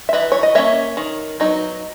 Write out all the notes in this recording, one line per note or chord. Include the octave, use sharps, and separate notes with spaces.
E5
E3 B4 D#5
C#5
D#5
A#3 C#4 C#5 E5
D#3
F#3 B3 D#4